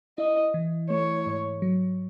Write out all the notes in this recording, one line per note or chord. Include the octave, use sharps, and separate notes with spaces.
E4 D#5
E3
A3 C#5
G#2
F#3